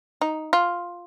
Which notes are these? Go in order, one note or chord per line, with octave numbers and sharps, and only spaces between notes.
D#4
F4